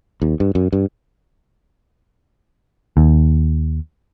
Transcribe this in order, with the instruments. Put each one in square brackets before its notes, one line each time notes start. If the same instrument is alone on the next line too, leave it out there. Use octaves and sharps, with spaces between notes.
[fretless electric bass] D#2
G2
F#2
G2
[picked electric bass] D#2